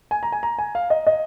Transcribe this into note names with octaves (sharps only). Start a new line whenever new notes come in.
G#5
A#5
G#5
A#5
G#5
F5
D#5
D#5